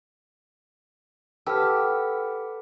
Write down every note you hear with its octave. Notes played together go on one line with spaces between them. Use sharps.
G4 A4 B4 F#5 E6 F6